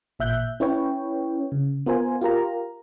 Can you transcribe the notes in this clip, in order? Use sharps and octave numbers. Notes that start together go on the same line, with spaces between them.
A1 A#2 E5 F#6 G6
C#4 E4 B4 C#5 G5
C#3
B3 F4 A#4 C5 G#5
F4 G4 A#4 A#5